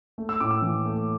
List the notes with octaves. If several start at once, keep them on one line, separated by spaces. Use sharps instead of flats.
A3
E6
A2 D6
E6
E3
A3